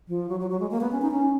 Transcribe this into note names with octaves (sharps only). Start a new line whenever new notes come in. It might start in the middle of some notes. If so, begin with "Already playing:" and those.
F3
F#3
F#3
F#3
G#3
A#3
B3
C#4
D#4
C#4